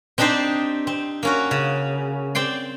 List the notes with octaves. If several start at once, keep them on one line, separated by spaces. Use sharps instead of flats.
C4 D4 D#4 G4 C5 D5
C4
A#3 C#4 F#4
C#3
C4 D5 G5 C6